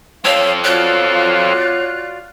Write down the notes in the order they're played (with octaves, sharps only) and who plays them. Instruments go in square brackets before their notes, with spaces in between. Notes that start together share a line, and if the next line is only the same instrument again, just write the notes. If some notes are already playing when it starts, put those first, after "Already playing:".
[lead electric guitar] C4 A4 [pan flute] C#5 [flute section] F5
[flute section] F4 F#4 D5 [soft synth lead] C#5 [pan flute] F#6